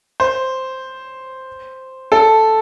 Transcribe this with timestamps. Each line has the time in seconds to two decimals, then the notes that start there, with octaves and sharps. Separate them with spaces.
0.20 C5
2.12 A4